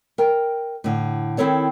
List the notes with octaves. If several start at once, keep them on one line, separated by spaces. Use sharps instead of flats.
A#4 G5
A2 D3
D#3 C4 E4 A4 C#5